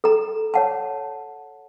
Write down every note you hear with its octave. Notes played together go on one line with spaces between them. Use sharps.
A4 A#5
C#5 F#5 A5